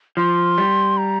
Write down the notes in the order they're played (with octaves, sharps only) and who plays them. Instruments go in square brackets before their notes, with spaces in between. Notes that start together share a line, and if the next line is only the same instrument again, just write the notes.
[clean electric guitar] F3 [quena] C6
[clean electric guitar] G3
[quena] A#5